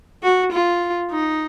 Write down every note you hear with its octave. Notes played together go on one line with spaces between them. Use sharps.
F#4
F4
D#4